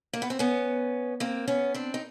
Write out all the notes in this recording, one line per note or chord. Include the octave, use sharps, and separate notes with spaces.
A#3
B3
C4
B3 C#4
A#3 C4
B3 C#4
C4 D4
D#4